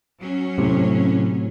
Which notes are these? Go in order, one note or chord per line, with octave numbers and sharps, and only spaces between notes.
F#3 C#4
A2 C3